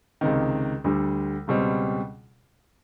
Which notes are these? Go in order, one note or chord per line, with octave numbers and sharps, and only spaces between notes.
C#2 C3 D#3
D2 D3 G3
C#2 B2 G3 C4